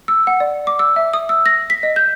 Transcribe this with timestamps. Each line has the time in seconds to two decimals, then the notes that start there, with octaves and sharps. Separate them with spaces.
0.08 E6
0.27 F#5
0.40 D5
0.67 D6
0.79 E6
0.96 E5
1.13 D#6
1.29 E6
1.46 A#6
1.70 B6
1.83 D#5
1.96 G6